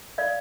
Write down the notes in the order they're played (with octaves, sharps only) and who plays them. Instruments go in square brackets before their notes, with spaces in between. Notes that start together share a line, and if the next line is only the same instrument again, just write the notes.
[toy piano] D5 F5